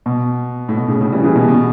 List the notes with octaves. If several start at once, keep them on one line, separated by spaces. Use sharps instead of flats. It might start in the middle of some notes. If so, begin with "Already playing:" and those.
B2
A2
B2
A2 C#3
A2 C#3
E3 G3
C#3 E3
B2
B2